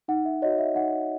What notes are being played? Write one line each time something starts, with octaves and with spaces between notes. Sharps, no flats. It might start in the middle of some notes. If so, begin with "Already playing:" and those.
D#4 F#5
E5
F#4 C#5 D#5
E5
D#4 F#5